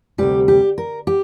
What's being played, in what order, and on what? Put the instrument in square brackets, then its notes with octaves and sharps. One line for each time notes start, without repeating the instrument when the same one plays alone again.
[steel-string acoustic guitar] D2 C3 G3 G4
G4
A#4
G4